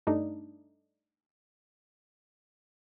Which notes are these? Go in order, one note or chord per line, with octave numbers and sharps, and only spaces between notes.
G2 A3 D4 D#4